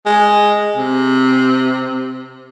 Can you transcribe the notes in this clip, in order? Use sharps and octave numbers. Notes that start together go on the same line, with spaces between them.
G#3
C3